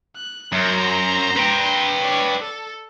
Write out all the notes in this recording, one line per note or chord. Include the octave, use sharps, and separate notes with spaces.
F#6
F#2 C5 A#5
B4 G5
C#5 D5
A4